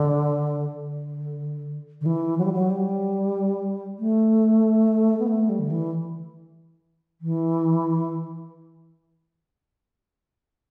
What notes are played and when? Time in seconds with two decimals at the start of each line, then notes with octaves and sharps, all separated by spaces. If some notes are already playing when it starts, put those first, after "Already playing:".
Already playing: D3
0.77 D3
2.01 D3
2.06 E3
2.38 F#3
2.45 G3
2.53 F#3
2.70 G3
3.99 A3
5.19 B3
5.27 A3
5.49 G3
5.59 D3
5.71 E3
7.21 E3